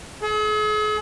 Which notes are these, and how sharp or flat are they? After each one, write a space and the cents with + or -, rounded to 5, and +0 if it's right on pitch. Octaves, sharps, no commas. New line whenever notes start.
G#4 +45